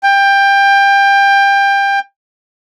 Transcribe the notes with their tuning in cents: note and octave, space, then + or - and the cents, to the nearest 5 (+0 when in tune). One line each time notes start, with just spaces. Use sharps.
G5 +20